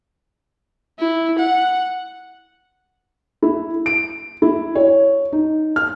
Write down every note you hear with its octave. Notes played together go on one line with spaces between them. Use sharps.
E4
F#5
E4
D7
E4
C#5
D#4
F6